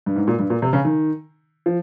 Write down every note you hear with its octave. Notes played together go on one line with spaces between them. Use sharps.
G2
G#2
A#2
G2
A#2
C3
C#3
D#3
F3